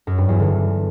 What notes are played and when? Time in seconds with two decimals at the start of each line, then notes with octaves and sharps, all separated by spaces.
0.07 F#2
0.18 G2
0.29 E2
0.40 D3